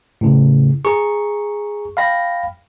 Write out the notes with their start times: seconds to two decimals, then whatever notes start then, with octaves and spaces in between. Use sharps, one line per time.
0.21 A2 C#3
0.85 G#4 A#5 C#6
1.97 F5 G5 B5 A#6